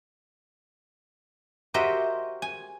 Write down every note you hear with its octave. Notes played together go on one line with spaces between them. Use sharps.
F#4 G4 A#4 C5 D#5 E5
G#5